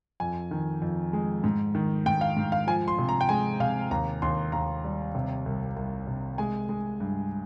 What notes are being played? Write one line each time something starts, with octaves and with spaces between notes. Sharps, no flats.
F2 G#5
D#3
F2
G#3
G#2
D#3
G#2 G5
F5
G#2
F5
F3 G#5
C6
C3
A#5
G5
G#3 G#5
C3 F5
D#2 A#5
D#2 C6
D#2 A#5
G3
C3
C2
C2
C3
G#3 G#5
G#3
G2